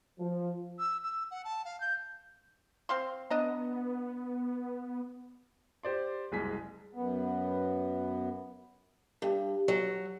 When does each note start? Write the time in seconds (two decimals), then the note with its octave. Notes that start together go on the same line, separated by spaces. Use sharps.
0.19 F3
0.79 E6
1.04 E6
1.31 F#5
1.45 A5
1.65 F5
1.81 G6
2.89 C4 F5 C6
3.30 B3 D4 D#5 A#5
5.83 G4 C5 D5 C6
6.32 F#1 C2 G#3 G#4 B6
6.95 F#2 B3
9.22 G2
9.68 F#3